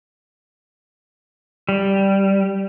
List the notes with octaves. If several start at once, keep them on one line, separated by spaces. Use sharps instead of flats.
G3